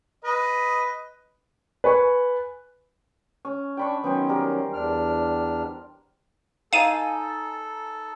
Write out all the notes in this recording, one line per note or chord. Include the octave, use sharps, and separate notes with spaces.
B4 D#5
B4 G#5 C#6
C#4
D4 G5 B5 C#6
D#3 F#3 B3 C#4 C5 G5
G3 A#4
E2 D4 F6
D#4 A4 D#5 F5 G#5 D#7